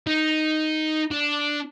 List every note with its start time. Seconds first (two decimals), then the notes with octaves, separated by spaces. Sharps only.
0.07 D#4
1.11 D4